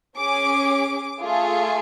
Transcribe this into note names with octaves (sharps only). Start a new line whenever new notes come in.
C#4 G#4 D6
A3 F4 G#4